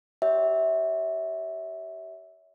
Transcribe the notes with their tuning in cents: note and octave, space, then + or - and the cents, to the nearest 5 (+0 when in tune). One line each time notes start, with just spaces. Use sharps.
G4 -25 C#5 +35 E5 -15